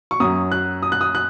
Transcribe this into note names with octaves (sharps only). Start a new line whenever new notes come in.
C#6
F#2 F#3 D#6
F#6
D#6
F#6
D#6
F#6